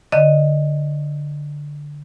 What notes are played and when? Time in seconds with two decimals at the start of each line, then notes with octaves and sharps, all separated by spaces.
0.12 D3 D#5